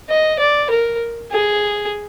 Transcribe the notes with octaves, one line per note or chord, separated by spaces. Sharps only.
D#5
D5
A#4
G#4